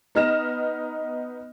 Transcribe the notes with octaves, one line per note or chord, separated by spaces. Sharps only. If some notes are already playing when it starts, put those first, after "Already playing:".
B3 D#4 D#5 F6 A#6 E7